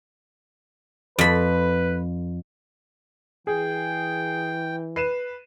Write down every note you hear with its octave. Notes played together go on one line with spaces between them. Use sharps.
F2 B4 B5
E3 G#4 G5
B4 C7 D#7 E7